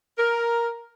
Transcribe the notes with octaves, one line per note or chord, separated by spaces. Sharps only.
A#4